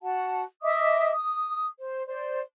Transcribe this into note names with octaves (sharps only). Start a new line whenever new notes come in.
F#4 F#5 A5
D#5 E5 D6 D#6
D#6
C5
C5 D5